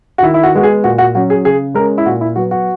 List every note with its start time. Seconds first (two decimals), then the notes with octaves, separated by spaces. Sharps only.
0.18 F#4
0.22 D#3 E4
0.34 E4
0.43 F#4
0.53 G#3 B3 F#4
0.63 G#4
0.84 A#2 F#4
0.98 F#4
1.15 F#3 C#4 F#4
1.30 G#4
1.45 C#3 G#4
1.74 G#3 C#4 A#4
1.98 E4
2.06 A#2 F#4
2.21 E4
2.36 F#3 B3 F#4
2.51 F#4